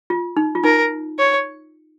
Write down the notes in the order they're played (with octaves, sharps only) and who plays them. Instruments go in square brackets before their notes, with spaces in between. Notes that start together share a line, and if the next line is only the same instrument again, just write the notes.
[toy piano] F4
D#4
F4
[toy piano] D#4 [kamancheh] A#4
[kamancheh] C#5